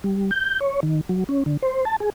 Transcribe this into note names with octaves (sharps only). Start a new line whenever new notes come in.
G3
G6
C#5
D#3
F#3
C#4
D3
C5
A5
G#4